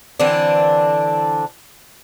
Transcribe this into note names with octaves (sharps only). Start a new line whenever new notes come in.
D3 E3 C4 D4